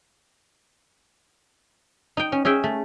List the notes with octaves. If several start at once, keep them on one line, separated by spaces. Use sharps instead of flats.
D#4 G5
C#4
C#4 G#4 E5 G5
A3